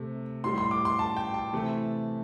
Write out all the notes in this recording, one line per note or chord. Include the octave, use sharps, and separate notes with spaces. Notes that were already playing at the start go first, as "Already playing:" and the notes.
Already playing: C3 A3
A2 G3 C6
C6
D6
C6
A5
G5
A5
C3 E3 A3